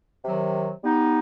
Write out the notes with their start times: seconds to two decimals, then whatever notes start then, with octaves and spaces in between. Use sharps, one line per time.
0.25 C3 D#3 F#3
0.83 G3 B3 D#4